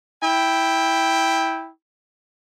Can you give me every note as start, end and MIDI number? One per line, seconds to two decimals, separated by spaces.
0.22 1.70 64
0.22 1.70 79